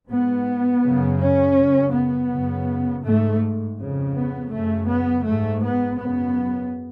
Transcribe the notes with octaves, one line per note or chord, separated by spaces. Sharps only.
G#2 B3
F#2 C#3
C#4
F#2 C#3
B3
F#2 C#3
G#2 A3
F2 C#3
B3
F#2 C#3 A3
B3
G#2 A3
B3
F#2 C#3 B3